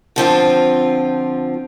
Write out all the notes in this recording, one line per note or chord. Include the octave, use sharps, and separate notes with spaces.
D3 F3 C4 F4